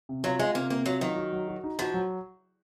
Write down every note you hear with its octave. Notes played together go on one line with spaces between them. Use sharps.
C3
F#3 F4
G#3 F4
C3 A#3
C3 A#3
F#3 F4
D#3 F#3
F#4
F#3
F#4
D#4
F3 F#4
F#3